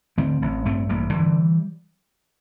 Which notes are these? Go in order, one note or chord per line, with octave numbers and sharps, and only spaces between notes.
D3 A3 C4
A1
G2 A3 C4
A1 G3 A#3
D3 E3 G3